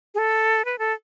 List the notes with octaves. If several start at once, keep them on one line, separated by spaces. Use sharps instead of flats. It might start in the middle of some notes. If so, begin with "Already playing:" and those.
G#4
A4
B4
A4